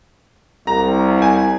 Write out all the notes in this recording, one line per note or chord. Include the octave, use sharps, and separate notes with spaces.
C2 A#5
C4 G#5